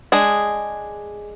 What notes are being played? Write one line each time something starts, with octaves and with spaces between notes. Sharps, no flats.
G#3 D4 G#4